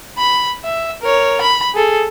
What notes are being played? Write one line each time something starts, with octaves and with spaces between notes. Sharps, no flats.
B5
E5
A#4 C#5
B5
G#4 A4